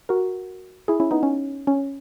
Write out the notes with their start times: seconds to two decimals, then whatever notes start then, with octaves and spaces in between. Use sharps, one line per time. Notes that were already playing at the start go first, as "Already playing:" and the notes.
0.09 F#4 A#4
0.88 E4 G#4
1.00 C#4 E4
1.11 B3 D#4
1.23 C#4
1.67 C#4